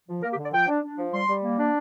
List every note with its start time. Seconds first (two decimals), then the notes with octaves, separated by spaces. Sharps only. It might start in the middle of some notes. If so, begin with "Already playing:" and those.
0.08 F3
0.23 A#3 A#4
0.33 G4
0.38 D3
0.43 D5
0.53 F3 G5
0.68 D4
0.83 D4
0.98 F3
1.13 G3 C6
1.29 G3
1.43 A#3
1.59 D4